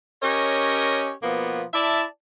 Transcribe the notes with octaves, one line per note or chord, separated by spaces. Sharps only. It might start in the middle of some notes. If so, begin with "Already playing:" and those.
C#4 G4 A#4 C#5 D#5
B2 F3 A#3 B3
E4 D5 E5 A5